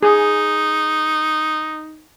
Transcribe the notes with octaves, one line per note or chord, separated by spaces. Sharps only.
D#4 G#4